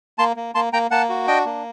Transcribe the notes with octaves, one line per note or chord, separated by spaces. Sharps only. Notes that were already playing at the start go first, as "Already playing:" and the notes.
A#3 A5 C6
A#3
A#3 A5 C6
A#3 G5 A#5
A#3 F#5 A5
F#4
D4 D#5 G5
A#3